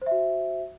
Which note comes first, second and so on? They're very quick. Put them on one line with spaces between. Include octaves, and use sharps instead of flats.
C5 E5 F#4